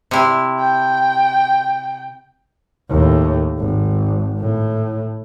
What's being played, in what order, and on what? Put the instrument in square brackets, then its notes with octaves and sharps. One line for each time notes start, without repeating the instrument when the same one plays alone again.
[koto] C3 E4
[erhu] G5
[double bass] D#2 A2
G#1
A2